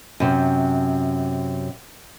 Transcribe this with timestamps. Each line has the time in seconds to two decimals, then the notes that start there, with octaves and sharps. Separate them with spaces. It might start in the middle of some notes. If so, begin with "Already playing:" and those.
0.20 F#2 C3